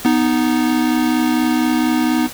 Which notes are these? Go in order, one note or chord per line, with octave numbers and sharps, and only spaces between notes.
B3 D#4